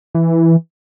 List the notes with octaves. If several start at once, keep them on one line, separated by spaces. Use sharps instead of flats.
E3